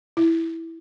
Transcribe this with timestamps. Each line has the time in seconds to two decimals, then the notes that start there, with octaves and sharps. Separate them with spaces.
0.17 E4